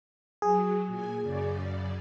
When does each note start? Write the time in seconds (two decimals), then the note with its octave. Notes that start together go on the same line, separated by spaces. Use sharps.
0.42 F#3 G#4
0.87 A#2 G#5
1.22 F#2 C#3 D5